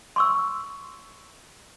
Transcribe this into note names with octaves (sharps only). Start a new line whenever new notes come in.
C6 C#6 E6